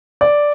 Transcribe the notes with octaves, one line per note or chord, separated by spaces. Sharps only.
D5